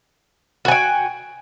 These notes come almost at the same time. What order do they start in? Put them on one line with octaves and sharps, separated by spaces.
F#4 G#5 G5